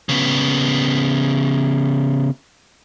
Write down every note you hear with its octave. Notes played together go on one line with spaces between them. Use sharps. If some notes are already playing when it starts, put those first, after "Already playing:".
C#3 B3